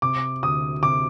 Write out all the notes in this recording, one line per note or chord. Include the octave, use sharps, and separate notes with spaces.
C3 D6
D2 D#6
C3 D6